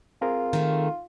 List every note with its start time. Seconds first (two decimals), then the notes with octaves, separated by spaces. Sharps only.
0.22 C4 F4 G#4 A#4
0.53 D#3 A3